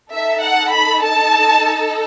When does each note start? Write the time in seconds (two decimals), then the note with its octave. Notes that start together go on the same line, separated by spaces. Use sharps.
0.13 D#4 A4 E5
0.43 F#5
0.73 B5
1.03 A5